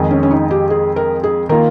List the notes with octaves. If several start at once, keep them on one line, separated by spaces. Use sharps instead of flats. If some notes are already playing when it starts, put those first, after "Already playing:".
Already playing: F2 D#3 G#3
C#4
C#4
D#4
G4
G#4
A#4
G#4
D#3 A#3 F4 A#4